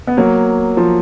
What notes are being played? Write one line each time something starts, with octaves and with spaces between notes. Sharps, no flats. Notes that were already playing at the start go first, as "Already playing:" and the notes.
B3
F#3 A#3
F3